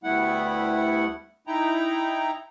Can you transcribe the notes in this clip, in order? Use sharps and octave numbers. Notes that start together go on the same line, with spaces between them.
D2 G3 A3 B3 E4 F#5
D#4 E4 G5 A#5